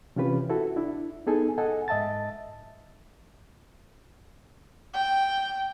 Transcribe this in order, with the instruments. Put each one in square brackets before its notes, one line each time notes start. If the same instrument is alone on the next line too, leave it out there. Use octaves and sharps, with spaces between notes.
[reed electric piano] C3 E3 C#4 F4 G4 B4
E4 F#4 A4
D4 E4
B3 D#4 G#4 A4 G#5
A4 D#5 F#5 G#5
G#2 D#5 E5 A5 A6
[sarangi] G5